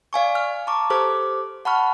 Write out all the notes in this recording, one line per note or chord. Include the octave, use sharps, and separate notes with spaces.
D5 F5 G#5 C#6
F6
A5 A#5 C#6 D6
G4 A4 C5 D6 F6
F#5 A5 B5 C#6 F6